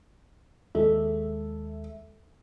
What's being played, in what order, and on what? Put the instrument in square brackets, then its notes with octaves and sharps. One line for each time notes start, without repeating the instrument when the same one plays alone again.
[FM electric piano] D#2 G#3 E5 [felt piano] A4